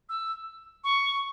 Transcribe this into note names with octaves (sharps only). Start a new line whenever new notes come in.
E6
C#6